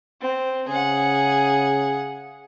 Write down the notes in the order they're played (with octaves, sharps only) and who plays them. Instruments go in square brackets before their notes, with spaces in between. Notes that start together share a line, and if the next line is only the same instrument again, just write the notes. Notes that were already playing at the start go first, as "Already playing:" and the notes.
[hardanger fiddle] C4
[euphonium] C#3 [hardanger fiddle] G#4 F#5